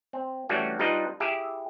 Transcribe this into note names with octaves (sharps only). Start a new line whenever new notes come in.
C4
E3 G3 A3 C#4 D4 F#4
G3 D4 D#4 F4 B4 D#5
E4 G4 G#4 E5